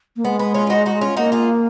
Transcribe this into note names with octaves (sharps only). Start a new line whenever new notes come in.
A#3
G#3 B3
B3
C#4 F4
F4
D#4 F#4
D#4 F#4
C#4 F4
A#3 D#4 F#4
F4 G#4